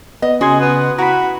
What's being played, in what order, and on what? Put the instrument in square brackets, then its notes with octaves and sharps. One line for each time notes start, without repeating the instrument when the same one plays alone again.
[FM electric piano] B3 [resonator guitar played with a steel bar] D#5
[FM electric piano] C#3 C6 G#6 [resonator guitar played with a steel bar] F#4 [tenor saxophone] G#4
[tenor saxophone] B3
[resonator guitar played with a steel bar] E4 [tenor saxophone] F#4 [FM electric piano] A#5 B5